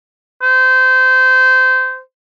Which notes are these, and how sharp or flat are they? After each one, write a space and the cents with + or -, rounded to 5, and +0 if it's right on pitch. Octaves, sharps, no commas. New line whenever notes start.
C5 -25